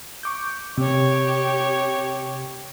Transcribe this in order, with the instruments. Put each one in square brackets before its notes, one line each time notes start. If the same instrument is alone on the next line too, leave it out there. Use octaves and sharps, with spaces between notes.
[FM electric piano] C#6 D6 G6
[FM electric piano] C3 [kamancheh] G4 C#5